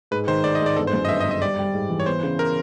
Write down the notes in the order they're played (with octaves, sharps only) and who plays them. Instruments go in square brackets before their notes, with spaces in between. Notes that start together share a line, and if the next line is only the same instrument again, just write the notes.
[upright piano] G#2 [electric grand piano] B4
[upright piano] D#3 [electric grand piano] C5
[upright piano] G#2 [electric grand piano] D5
[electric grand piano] D#5
[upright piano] G#2
[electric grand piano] D5
[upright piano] G1 [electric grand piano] A4
[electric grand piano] C5
[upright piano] F#2
[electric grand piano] D#5
[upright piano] G1 [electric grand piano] E5
[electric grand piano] D#5
[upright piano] G1
[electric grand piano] D#5
[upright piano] G3 [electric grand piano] D5
[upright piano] G3
G#2
E3
[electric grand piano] C#5
[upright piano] B3 [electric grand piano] C5
[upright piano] C#3
[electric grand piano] A#4